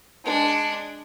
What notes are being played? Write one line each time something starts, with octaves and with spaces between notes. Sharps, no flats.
G#3 D4